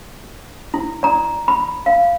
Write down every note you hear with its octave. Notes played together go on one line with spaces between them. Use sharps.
E4
D5 A#5
B5
F5